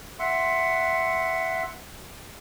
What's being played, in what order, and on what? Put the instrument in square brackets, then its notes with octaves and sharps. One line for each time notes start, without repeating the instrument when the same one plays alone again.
[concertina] E5 F#5 C6